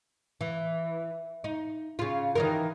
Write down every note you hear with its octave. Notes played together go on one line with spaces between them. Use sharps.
E3
D#4
C#3 F4
D#3 E3 A#4